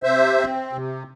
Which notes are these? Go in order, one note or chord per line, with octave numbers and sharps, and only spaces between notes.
C3 C5 E5
C4
C3